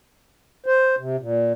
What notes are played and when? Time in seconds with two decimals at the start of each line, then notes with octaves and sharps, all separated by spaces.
0.66 C5
0.98 C3
1.19 A#2